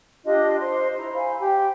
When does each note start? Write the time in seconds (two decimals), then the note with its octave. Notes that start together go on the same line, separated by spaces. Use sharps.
0.24 D4 F4 G4 D#5
0.58 C5 C6
0.96 E4 C5 A#5
1.14 C5 F5 G#5 B5
1.39 G4 G5